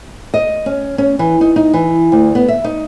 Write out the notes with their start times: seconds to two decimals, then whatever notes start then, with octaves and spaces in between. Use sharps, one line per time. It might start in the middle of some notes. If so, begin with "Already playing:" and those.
0.34 D#5
0.66 C#4
0.98 C#4
1.19 E3
1.41 D#4
1.56 D#4
1.74 E3
2.12 D2
2.35 B3
2.49 E5
2.64 D#4